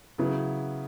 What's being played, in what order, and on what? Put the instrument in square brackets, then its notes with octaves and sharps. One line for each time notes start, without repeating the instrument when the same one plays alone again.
[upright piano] C#3 F#3 B3 E4